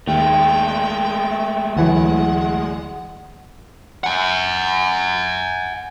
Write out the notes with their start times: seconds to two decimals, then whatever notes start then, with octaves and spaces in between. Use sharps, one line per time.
0.07 D#2 G#3 A3 G5
1.76 D2 E3 F#3 F#5
4.04 F#5 G#5